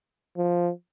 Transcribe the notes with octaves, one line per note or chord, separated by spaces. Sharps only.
F3